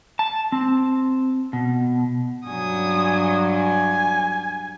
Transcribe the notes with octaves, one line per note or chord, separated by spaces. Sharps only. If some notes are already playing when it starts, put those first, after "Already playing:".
A5
C4
B2
G2 F#3 G#5 D#6
G#5